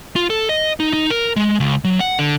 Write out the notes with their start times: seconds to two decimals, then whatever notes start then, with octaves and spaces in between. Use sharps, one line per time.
0.16 F4
0.30 A4
0.49 D#5
0.80 D#4
0.93 D#4
1.10 A#4
1.36 G#3
1.60 C#2
1.84 F#3
2.00 F#5
2.19 D3